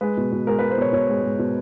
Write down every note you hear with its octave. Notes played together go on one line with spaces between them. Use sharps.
G#3 B4
B2
B2
G#3 A#4
B4
G#3
C5
B2 C#5
B2 C#5
G#3
G#3
B2